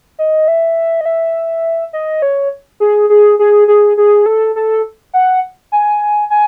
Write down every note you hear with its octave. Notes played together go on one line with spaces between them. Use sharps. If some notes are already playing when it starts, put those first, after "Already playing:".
D#5
E5
D#5
E5
D#5
C#5
G#4
G#4
G#4
G#4
G#4
A4
A4
F#5
G#5
G#5